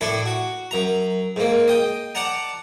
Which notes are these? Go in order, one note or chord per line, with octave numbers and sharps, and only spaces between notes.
A2 D4 E4 A4
F#4
F#2 A#5
G#2 A#3
D#5 G5
D5 F#5 A5 A#5